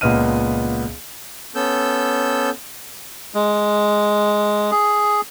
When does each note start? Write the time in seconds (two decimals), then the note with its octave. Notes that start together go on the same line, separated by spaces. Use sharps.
0.01 C#2 A#2 B3 D#5 F6 D#7
1.55 B3 C#4 A4 E6 G6
3.34 G#3
4.71 G#4